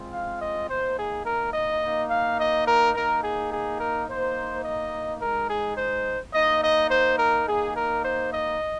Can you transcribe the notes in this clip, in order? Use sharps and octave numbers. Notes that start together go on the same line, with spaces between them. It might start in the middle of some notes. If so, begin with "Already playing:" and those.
Already playing: G#3 C4 F4
F5
D#5
A#3 D#4 C5
G#4
A#4
D#5
A#3 D#4
F5
D#5
A#4
A#3 D#4 A#4
G#4
G#4
A#4
A#3 D#4 C5
D#5
G#3 D#4 A#4
G#4
C5
A#3 D#4 D#5
D#5
C5
A#4
A#3 D#4 G#4
A#4
C5
D#5